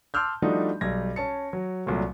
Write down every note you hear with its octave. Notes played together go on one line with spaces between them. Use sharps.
A5 C6 D6 E6 F6 G6
F3 G3 A3 D4 D#4 F#4
B1 G3 G#6 A#6
C#4 A5 C#7
F#3
C2 A#2 F#3 A3